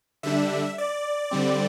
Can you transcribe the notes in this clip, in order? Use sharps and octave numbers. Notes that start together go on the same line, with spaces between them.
D3 G3 D4 E5
D5
D3 G3 C4